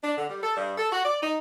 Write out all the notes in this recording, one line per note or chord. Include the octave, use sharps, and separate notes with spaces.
D4
D3
G3
A4
G2
A4
F#4
D5
D#4